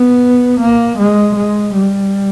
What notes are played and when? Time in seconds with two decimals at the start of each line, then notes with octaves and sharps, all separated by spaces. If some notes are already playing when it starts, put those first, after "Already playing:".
Already playing: B3
0.60 A#3
0.98 G#3
1.36 G#3
1.73 G3